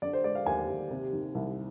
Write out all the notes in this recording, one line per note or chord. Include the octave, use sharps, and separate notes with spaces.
D3 D5
C5
G#3 D5
F5
D#2 G#5
D#2
C3
D#3
C2